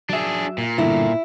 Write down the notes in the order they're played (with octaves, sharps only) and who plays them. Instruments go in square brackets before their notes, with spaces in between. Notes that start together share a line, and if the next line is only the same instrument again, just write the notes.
[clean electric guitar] F#3 E5 [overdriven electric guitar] D4 G#4
[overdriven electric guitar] A#2
[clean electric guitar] G2 B2 D3 [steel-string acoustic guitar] E4